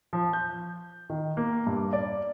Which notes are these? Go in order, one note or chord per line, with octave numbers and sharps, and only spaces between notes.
F3
G6
D#3
A#3
G2
D5